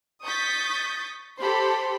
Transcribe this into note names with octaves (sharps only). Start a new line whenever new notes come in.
C#6 D#6 G6 A6 B6
G4 A4 C5 B5 C6